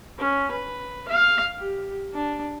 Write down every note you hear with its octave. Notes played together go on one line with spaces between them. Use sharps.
C#4
B4
F5
G4
D4